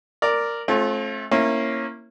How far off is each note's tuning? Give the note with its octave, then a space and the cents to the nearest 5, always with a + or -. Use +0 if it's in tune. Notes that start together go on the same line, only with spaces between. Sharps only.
A#4 -5 D5 +0
A3 -25 C4 +45 F4 +10
A#3 -10 C#4 -25 E4 +0